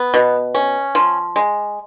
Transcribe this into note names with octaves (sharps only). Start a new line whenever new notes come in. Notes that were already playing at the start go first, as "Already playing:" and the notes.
Already playing: B3
B2
C#4
F3
G#3